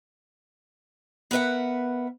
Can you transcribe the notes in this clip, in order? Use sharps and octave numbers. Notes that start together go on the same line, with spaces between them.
B3 A#4 B4 E5 F#5